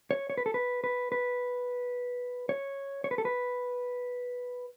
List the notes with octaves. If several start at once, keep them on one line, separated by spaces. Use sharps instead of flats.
C#5
C#5
B4
A4
B4
B4
B4
C#5
C#5
B4
A4
B4